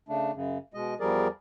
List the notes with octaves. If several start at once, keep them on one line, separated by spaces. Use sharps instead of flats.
C#3 A3 D4
F#2 C#3
B2 G#3 D#5
E2 F3 G3 G#4 A#4 D5